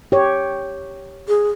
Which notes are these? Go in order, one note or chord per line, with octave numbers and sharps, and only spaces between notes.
G4 C#5
G#4